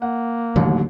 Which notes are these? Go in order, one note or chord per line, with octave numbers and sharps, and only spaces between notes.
A#3 F#5
D#1 A1 D#2 D3 F#3